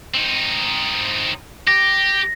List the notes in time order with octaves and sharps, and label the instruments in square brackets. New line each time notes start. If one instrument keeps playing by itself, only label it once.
[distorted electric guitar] C4 D#4
[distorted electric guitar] G4 [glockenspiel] A#6